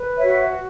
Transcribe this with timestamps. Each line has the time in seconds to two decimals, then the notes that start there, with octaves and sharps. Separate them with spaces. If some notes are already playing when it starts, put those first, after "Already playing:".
Already playing: B4
0.16 C#5 E5
0.24 F#4